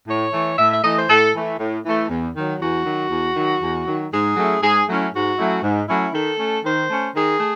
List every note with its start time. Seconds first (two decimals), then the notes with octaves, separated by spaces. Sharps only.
0.08 A2 C#5
0.33 E3 A3
0.58 A2 E5
0.72 E5
0.84 E3 A3 D#5
0.97 C5
1.09 A2 A4
1.35 E3 A3
1.59 A2
1.85 E3 A3
2.10 E2
2.35 D#3 F#3
2.61 E2 F#4
2.85 D#3 F#3
3.11 E2
3.36 D#3 F#3
3.62 E2
3.87 D#3 F#3
4.12 G#2 G#4
4.37 F#3 A3 C#4 E4
4.62 G#2 G#4
4.88 F#3 A3 C#4 E4
5.14 G#2 F#4
5.38 F#3 A3 C#4 E4
5.63 G#2
5.88 F#3 A3 C#4 E4
6.13 D#3 A4
6.39 A3 C#4
6.65 D#3 C5
6.90 A3 C#4
7.15 D#3 G#4
7.40 A3